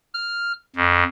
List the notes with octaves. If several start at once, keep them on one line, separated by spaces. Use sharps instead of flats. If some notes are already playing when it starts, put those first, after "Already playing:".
F6
F2